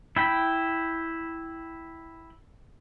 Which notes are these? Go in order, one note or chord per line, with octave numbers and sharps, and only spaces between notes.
E4 G5 B5